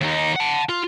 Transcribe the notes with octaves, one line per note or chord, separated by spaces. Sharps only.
D#2 D#4
F#5 A5
F4